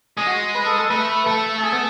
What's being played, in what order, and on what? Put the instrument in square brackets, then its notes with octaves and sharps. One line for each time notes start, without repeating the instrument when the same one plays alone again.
[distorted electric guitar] G#3 [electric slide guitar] G#4
[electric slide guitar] F#4
B4
A4
A4
[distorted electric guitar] A3 [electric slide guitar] B4
[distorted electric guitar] A3 [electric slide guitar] A4
[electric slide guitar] A4
G#4
B3